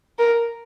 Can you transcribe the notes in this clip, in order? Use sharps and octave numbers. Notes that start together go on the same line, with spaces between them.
A#4